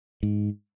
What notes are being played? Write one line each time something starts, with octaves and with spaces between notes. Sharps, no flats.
G#2